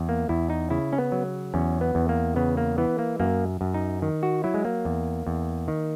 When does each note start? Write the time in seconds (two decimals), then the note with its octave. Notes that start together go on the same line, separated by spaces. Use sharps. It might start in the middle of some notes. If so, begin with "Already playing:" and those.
Already playing: E2
0.09 A#3
0.29 E2 E4
0.50 D#4
0.70 C#3 E4
0.93 C#4
0.98 B3
1.12 F#3
1.54 E2 C#4
1.81 B3
1.95 E2
2.09 A#3
2.36 C#3 B3
2.57 A#3
2.78 E3 B3
2.99 A#3
3.20 F#2 A#3
3.61 F#2
3.74 D#4
4.02 D#3
4.23 F#4
4.44 F#3 E4
4.54 G#3
4.65 A#3
4.85 E2
5.27 E2
5.68 D#3